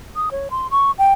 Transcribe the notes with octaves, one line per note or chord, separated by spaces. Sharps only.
D#6
C#5
C6
C#6
G5